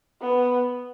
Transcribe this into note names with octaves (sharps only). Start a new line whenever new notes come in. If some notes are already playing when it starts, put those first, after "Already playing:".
B3